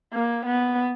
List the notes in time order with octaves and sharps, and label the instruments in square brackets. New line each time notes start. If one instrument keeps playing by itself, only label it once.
[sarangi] A#3
B3